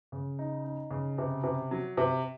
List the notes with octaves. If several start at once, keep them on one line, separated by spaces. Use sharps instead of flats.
C#3
D#4
D#4
C#3
C3
C3
F#3
C3